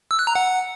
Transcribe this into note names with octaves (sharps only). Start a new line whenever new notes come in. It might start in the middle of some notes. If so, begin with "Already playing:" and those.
E6
F#6
A#5
F#5